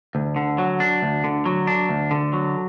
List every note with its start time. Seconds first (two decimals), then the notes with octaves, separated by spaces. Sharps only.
0.15 D2
0.36 D3
0.58 F#3
0.80 D4
1.02 D2
1.24 D3
1.46 F#3
1.67 D4
1.89 D2
2.11 D3
2.33 F#3